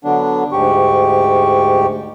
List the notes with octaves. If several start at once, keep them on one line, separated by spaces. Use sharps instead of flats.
D3 F#3 B3 D4
D2 G#2 G4 C#6